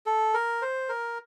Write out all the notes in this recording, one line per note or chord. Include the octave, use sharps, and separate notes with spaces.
A4
A#4
C5
A#4